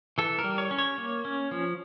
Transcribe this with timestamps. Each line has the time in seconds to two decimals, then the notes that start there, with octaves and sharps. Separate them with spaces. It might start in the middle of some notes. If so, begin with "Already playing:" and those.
0.18 E3 A4
0.39 A#4
0.44 G3
0.58 C#5
0.71 C#4
0.78 C#5
0.98 A#3
1.25 C#4
1.51 F3